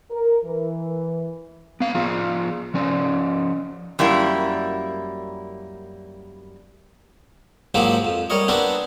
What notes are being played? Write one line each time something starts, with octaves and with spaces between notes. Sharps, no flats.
A#4
E3
B3 F5
F3 F4 G#4
F3 C#4 D5
F#2 G3 A#3 E4
G#2 F3 F#3 A#3 C4 G4
F2
G3 A#4 C#5 D#5
B3 C4 D4 G4 A#4